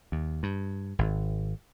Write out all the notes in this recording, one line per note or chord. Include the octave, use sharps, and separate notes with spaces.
D#2
G2
G#1